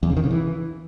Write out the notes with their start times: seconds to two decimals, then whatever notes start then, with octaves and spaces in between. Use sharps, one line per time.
0.03 E2
0.10 C#3
0.17 D#3
0.24 C#3
0.31 E3